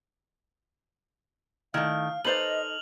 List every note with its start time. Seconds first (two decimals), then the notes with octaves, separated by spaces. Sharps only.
1.74 D#3 A3 E4 F5 F6
2.25 D#4 A4 B4 C5 D5 D#5 F7 F#7